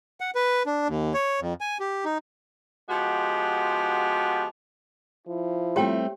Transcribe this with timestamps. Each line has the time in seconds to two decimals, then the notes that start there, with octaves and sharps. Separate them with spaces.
0.21 F#5
0.35 B4
0.66 D4
0.88 D#2
1.14 C#5
1.40 F2
1.61 G#5
1.80 G4
2.05 D#4
2.89 F3 G#3 B3 F#4 G4
5.27 F3 E4
5.76 G3 A3 C4 G4 C#5 G5